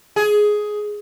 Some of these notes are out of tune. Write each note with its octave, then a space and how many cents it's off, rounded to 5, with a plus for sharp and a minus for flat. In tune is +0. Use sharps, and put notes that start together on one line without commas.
G#4 +10